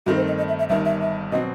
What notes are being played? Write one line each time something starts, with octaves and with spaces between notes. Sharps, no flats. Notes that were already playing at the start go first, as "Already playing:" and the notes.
G2 D#3 A3 C4 F#4
C5
D#5
D#5
E5
E5
G1 G2 D#3 E5
E5
E5
B2 F#3 C4 D#5